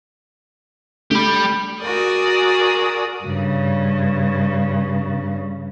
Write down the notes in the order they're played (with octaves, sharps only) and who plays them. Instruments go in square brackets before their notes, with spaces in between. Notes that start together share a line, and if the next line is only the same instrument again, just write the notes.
[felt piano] A3 [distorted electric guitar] G4 B5
[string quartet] F#4 G#4 A#4 D5 D#6
[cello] G2 C#3